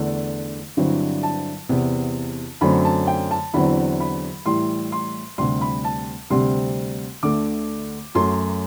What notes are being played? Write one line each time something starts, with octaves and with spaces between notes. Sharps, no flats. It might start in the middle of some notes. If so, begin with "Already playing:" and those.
Already playing: E2 D3 A3 D4
G2 D3 F#3 C4 E4 C5
A5
E2 C3 E3 B3
F#2 D3 F#3 A3 C4 B5
A5
G5
A5
E2 D3 F#3 C4 E4 B5
B5
A2 E3 G3 C6
C6
D2 C3 G3 C6
B5
A5
D2 C3 G3 C4 C6
D2 D3 A3 D6
F#2 F#3 A3 C6